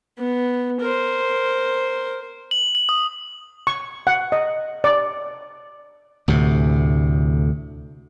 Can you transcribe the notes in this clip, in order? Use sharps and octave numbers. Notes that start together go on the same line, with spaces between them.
B3
A#4 C5
F#7
F#7
D#6
C#6
F#5
D#5
D5
D2 A2 C3